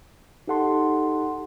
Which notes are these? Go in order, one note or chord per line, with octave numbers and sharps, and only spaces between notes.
D#4 G4 A4 F#5 A5 C6